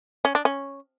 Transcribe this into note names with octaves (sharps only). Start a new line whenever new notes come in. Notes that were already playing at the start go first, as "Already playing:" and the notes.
C#4
D4
C#4